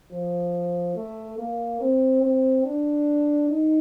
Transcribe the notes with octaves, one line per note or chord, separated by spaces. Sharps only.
F3
A3
A#3
C4
C4
D4
D#4